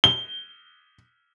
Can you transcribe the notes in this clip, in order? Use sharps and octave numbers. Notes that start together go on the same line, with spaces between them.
G7